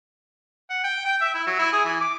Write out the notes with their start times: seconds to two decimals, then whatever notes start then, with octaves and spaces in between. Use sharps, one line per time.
0.70 F#5
0.84 G5
1.05 G5
1.21 E5
1.35 E4
1.46 F#3
1.59 E4
1.72 G#4
1.85 E3
2.01 D6